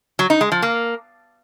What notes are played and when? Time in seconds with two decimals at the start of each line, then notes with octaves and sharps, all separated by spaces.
0.19 F#3
0.30 D#4
0.41 G#3
0.52 F3
0.62 A#3